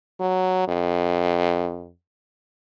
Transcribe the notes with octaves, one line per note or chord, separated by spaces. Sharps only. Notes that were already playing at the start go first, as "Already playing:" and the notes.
F#3
F2